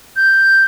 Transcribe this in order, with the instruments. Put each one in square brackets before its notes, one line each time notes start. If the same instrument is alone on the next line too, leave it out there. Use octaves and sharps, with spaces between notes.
[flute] G6